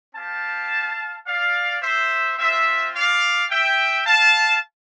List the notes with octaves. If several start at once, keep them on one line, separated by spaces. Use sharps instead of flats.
C4 G4 F5 A5
D5 F5
C5 E5
C4 F4 C5 E5
D5 F5
E5 G5
F5 A5